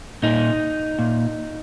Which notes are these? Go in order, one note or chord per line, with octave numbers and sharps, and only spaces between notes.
A#2 D#4
A#2